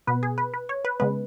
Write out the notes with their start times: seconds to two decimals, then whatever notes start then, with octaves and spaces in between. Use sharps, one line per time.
0.07 B2 B3 B4
0.23 G#4
0.38 B4
0.54 B4
0.69 C#5
0.85 B4
1.00 C#3 G#3 B3 B4